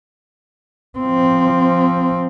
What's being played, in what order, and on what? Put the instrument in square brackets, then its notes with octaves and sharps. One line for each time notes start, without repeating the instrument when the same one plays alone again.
[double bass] F3 C4